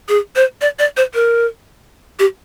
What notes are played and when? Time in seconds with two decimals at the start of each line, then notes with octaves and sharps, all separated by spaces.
0.09 G#4
0.36 C5
0.61 D5
0.79 D5
0.97 C5
1.14 A#4
2.19 G4